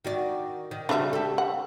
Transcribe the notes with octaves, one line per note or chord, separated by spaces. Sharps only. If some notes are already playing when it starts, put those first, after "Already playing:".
D#3 F#4 D5
D#3
C#3 G3 D4 F#4 E5
G4 A4
F#5